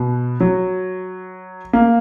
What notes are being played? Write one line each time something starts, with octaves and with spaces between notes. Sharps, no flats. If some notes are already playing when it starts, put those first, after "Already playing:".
Already playing: B2
F#3
A#3